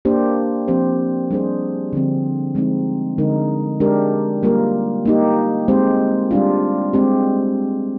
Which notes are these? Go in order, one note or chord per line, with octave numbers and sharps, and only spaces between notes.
A#3 D4 G4 C5
F3 C4 G4 C5
G3 D4 G#4 C5
D3 F3 C4
F3 G#3 C4 D#4
D3 G#3 D#4 A#4
G#3 D4 G4 A#4
G3 A#3 F4 A#4
A#3 D#4 G4
G#3 C4 G4 C5
G3 D4 F4
G#3 C4 G4